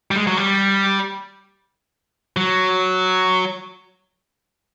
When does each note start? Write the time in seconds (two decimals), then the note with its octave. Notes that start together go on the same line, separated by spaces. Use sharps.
0.11 G3
0.16 G#3
0.27 F#3
0.37 G3
2.37 F#3